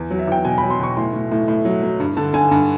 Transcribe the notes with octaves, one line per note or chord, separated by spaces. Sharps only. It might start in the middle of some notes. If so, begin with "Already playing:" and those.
Already playing: E2
F#3
E5
E2 G5
B2 G#5
B5
F#3
C6
B2 C#6
A2 C6
A2
A2
A2
F#3
F#3
G2
D3 A5
D3 G#5
G2